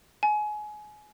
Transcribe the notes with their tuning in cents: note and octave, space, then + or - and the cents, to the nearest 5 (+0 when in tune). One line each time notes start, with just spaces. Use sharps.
G#5 +25